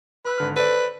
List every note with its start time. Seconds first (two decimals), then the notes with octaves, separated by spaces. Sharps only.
0.25 B4 B5 E6 F#6
0.38 G#1 D3 F6
0.56 A4 B4 C5 D5